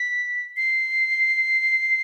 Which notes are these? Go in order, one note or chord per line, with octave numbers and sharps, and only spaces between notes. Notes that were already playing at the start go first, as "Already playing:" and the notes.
Already playing: B6
C7